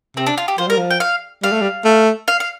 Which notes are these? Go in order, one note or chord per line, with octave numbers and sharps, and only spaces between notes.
C3 C4
D4
F4
G4
F3 C5
G3 A#4
F3
G5
F5
G3 F5
A3
G3
A3
F5
F5